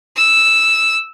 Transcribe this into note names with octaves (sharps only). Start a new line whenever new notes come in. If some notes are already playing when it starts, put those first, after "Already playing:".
E6